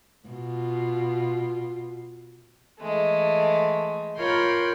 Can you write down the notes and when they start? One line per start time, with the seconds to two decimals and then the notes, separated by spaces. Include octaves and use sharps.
0.28 B2 F4
2.80 E3 G#3 A3
4.18 F4 A#4 C#5 G5 B5 C6